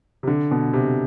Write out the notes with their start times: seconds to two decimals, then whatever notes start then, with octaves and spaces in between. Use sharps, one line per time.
0.23 C3
0.28 D3
0.51 B2
0.73 C3